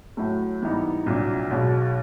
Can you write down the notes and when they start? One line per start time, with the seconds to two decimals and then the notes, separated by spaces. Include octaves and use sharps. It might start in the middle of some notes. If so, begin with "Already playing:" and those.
0.17 A2 F#3 A3
0.62 G#2 E3 G3 B3 D#4
1.06 C2 A#2 F#3 A#3 D4
1.51 B1 B2 G#3